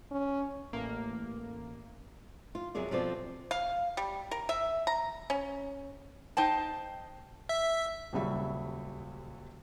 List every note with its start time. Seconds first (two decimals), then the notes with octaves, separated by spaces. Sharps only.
0.11 C#4
0.73 A1 A#3
2.55 F4
2.75 F2 C3 F#3 G#4 A#4 D5
2.91 B2 F3 C4 F4 A4 D5
3.51 F5
3.97 G3
4.31 A#4
4.49 E5
4.87 A#5
5.30 C#4
6.37 D#4 C5 G5 A5
7.49 E5
8.13 D#1 C#2 F#3 G3 E5